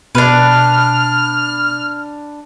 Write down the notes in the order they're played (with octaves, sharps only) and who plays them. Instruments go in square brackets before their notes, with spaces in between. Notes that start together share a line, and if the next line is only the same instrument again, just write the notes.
[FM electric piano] B2 B5 [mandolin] D4 B4 [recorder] F6